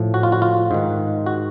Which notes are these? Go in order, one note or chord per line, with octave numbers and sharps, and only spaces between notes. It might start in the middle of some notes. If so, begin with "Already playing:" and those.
Already playing: A2 F3
F#4
F4
F#4
F4
G#2 D#3
F#4